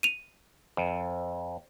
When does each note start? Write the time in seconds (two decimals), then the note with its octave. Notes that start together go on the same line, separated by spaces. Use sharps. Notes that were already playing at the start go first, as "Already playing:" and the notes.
0.03 D#7 F7
0.77 F2